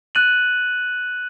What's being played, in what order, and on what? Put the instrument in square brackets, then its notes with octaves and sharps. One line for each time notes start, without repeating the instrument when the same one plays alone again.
[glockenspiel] F#6 A6 D#7 F#7